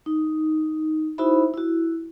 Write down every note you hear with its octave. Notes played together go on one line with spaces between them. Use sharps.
D#4
D#4 E4 F#4 C5 E5 B5
E4 F#4